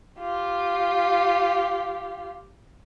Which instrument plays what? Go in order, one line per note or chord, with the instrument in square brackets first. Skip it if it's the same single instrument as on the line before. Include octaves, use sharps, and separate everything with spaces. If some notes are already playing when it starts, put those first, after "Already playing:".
[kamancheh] F4 G4